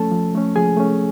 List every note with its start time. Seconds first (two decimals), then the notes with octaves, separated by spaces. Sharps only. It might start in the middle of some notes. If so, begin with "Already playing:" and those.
Already playing: F3 A3 C#4 A4 A5
0.12 F3
0.35 A3 C#4
0.56 F3 G#4 G#5
0.77 A3 C#4